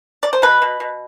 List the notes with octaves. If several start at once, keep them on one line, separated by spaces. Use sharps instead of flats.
D5
C5
B2 B4
B2
B2